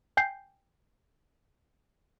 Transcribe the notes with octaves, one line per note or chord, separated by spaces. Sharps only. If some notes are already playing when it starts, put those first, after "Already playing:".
G5 G#5 G6 C7